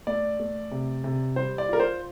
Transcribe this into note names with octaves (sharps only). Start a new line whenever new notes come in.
A3 D5
A3
C3
C3
G3 C5
D5
F4 A#4
C5